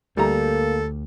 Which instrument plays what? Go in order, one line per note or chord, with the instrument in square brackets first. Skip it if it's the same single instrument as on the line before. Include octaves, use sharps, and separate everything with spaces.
[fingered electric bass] D2 D3 [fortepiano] G3 A#5 [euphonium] A#3 [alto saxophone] A4